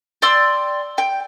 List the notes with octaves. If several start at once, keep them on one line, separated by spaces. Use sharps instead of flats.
D5 G5 C6 E6
G5